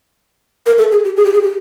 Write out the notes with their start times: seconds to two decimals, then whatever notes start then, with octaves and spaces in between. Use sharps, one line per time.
0.66 A#4
0.78 A4
0.92 G#4
1.05 G4
1.16 G#4
1.25 G4
1.33 G#4
1.43 G4